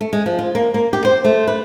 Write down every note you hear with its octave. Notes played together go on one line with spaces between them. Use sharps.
A3
G#3
F3
F4
A#3
A#3
G4
C5
A3
B4